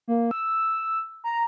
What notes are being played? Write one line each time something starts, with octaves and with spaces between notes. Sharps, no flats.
A#3
E6
A#5